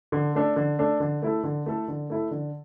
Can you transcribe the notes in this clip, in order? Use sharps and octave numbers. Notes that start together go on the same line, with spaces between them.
D3
A3 D4 A4
D3
A3 D4 A4
D3
A3 E4 A4
D3
A3 E4 A4
D3
A3 E4 A4
D3